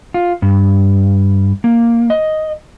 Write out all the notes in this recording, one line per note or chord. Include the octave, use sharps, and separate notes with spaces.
F4
G2
A#3
D#5